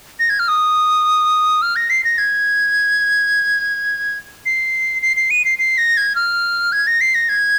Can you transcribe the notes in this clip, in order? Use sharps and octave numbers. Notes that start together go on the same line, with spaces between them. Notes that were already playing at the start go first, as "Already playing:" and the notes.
A#6
G#6
F6
D#6
F6
A#6
C7
A#6
G#6
C7
C7
C7
D#7
C7
C7
A#6
G#6
F6
G#6
A#6
C7
A#6
G#6